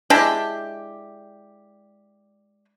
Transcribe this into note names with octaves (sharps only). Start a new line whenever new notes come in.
G#3 D4 E4 G4